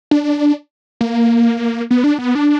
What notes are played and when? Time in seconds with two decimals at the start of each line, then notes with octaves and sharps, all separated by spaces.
0.11 D4
1.01 A#3
1.91 B3
2.04 D4
2.19 B3
2.35 D4